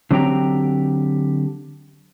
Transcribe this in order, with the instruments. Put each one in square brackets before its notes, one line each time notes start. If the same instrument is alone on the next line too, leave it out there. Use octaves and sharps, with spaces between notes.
[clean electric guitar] D3 F#3 C4 G4 G5 A#5